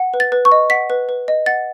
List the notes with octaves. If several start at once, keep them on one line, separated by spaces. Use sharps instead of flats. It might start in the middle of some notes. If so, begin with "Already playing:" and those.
Already playing: F#5
B4
A6
B4
C#6
D#5
F#5 B6
B4
B4
D#5
F#5 A6